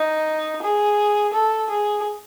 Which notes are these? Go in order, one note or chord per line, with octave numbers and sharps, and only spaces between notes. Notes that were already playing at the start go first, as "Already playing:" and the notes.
Already playing: D#4
G#4
A4
G#4